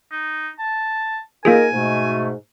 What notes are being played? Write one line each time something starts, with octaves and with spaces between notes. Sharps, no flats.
D#4
A5
A#3 D#4 F4 G#4 A#4 G#5
G#2 B2 A3